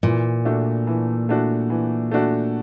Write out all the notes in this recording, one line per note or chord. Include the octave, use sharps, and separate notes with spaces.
A#2 E3
A3 D4 F#4
E3
A3 D4 F#4
E3
A3 D4 F#4